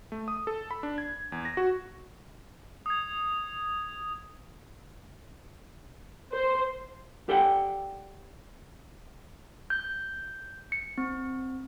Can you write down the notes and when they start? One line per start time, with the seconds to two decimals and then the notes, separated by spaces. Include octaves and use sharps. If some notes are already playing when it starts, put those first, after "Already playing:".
0.12 A3
0.28 D#6
0.47 A4
0.71 B5
0.83 D4
0.98 G#6
1.32 E2
1.45 A#6
1.57 F#4
2.86 D#6 G#6
6.32 C5
7.29 G4 A4 D5 F#5 G5
9.70 G6
10.72 C#7
10.98 C4